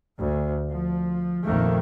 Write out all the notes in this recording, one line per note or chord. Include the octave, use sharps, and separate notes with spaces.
D2
F3
A#1 F2 D#3 A3 A#3